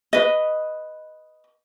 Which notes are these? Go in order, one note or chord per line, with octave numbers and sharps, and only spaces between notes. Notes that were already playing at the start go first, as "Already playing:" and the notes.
B4 D#5